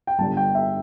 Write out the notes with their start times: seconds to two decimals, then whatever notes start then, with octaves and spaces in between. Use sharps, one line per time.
0.07 G5
0.18 G1 G2 D3 A5
0.37 G5
0.55 E5